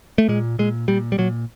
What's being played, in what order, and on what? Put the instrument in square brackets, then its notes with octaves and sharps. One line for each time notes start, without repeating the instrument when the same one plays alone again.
[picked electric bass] A3
A#2 G#3
A#2 G#3
A#2 G3
G3
A#2 F#3